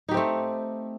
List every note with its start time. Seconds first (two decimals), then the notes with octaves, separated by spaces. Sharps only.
0.09 D#4
0.11 G4
0.14 C4
0.17 A3